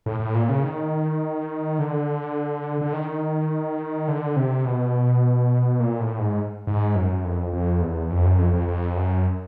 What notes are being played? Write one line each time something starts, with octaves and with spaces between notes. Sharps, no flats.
A2
A2
A#2
C#3
D#3
D3
D3
D#3
D3
C3
B2
A#2
A2
G#2
G#2
F#2
F2
F2
E2
F2
F#2
F2
F2
F2
F#2